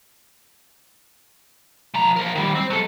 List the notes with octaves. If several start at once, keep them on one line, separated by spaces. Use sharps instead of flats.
F3 A#5
F3 A#4
D#3 G3
C4
F#3 A4